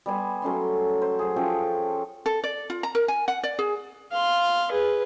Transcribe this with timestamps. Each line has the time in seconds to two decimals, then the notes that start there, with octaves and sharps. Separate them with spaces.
0.06 G3 B3 G#5 C6
0.42 F#3 A3 C#4 C6
1.02 C5
1.19 F#3 F#4 G#4
1.36 F3 C#4 A4 G5
2.26 A4
2.44 D5
2.70 F4
2.83 A#5
2.95 A#4
3.08 G#5
3.28 F#5
3.43 D5
3.59 G#4
4.12 F5 C6
4.72 G#4 B4